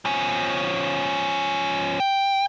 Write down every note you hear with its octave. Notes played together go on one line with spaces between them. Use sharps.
F3 C#4
G5